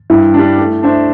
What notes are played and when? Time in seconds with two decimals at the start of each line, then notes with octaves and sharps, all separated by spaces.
0.10 G2 E4
0.34 G3 D4
0.58 A3
0.83 D4 C5 E5